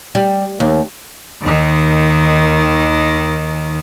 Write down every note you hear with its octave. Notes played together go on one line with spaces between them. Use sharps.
G3
D#2
D#2 D#3